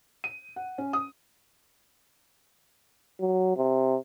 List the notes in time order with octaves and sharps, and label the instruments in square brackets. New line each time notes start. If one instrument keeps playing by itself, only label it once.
[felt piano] D#7
F#5
C#4
D#6
[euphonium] F#3
C3